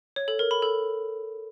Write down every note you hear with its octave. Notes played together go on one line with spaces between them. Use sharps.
C#5
A4
A#4
B5
A4